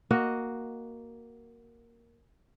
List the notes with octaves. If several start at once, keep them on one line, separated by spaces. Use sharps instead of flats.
A#3 F#4 D#5